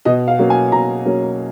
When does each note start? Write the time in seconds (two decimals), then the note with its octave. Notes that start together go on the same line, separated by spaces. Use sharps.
0.05 B2 D#5
0.28 F5
0.39 F#3 A#3 C#4
0.50 G#5
0.72 B2 A#5
1.06 F#3 A#3 C#4